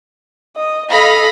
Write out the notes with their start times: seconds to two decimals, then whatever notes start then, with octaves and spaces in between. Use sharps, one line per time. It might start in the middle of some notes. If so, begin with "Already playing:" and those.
0.56 D#5
0.92 A4 D#5 F5 B5 A#6